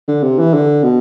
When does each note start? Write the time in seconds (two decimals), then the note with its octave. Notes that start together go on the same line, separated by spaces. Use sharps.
0.08 D3
0.23 C3
0.39 E3
0.54 D3
0.83 B2